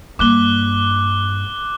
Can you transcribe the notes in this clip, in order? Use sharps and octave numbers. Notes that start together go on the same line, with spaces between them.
G2 A#3 D6 F#6 G7